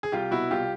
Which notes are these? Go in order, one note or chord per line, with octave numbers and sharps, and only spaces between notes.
G#4
C2 F4 G4
B2 E4 F#4
C2 F4 G4